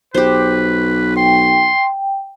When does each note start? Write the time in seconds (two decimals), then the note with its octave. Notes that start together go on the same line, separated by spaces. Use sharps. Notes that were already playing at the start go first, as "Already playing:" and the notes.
0.14 B1 G4 B4 C5
1.17 G5 C6